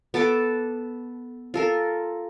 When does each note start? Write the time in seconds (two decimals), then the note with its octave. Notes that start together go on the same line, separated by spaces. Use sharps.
0.14 B3 A4 A5 D6
1.54 F4 A4 A#4